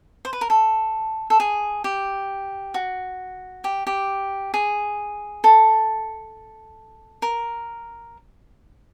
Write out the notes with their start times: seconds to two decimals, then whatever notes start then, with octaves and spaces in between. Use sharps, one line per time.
0.25 C5
0.33 B4
0.41 A#4
0.50 A4
1.30 A4
1.40 G#4
1.84 G4
2.74 F#4
3.64 G4
3.87 G4
4.54 G#4
5.44 A4
7.22 A#4